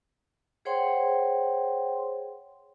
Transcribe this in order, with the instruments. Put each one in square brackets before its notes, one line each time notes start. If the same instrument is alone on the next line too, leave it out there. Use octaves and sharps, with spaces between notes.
[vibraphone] G#4 C5 C#5 F#5 G5 C6